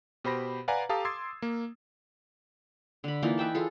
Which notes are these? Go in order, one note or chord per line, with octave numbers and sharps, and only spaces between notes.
B2 G4 C5 B5 A#6
B4 D5 F5 F#5 G#5 A#5
G4 A4 F5 A5 A#5 D#6
C6 D6 E6 G#6 A6 C7
A#3
D3 B5
E3 A#3 D#4 F4
B4 E5 G5 A5
F4 G#4 A4